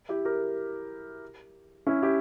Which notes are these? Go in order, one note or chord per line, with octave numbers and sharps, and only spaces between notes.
E4 G4
G4 A#4
C#4 E4
E4 G4